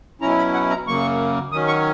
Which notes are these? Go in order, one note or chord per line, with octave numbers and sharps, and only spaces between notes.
B2 F#3 C#4 E4 A#5
B5
F#5
A#5
F#2 C#3 F#3 A#3 C#6
D#3 F#3 C#4 D#6
C#6